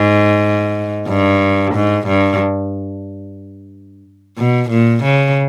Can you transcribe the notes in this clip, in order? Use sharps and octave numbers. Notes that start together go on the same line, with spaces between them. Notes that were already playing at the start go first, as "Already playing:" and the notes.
Already playing: G#2
G2
G#2
G2
B2
A#2
C#3